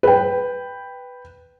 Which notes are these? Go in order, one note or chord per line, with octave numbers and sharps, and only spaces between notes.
B4 G5